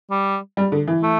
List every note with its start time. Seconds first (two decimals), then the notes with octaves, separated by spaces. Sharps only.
0.11 G3
0.57 G3
0.72 D3
0.87 E3
1.03 A3